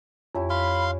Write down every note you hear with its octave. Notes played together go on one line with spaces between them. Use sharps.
F2 C#4 E4 G4
F5 B5 C6